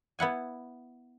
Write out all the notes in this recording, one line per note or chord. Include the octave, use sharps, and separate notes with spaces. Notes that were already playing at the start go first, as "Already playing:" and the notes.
B3 E4 F#5 G#5